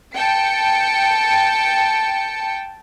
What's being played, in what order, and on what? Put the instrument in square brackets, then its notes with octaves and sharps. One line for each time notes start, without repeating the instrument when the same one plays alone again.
[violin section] G5 A5 C#7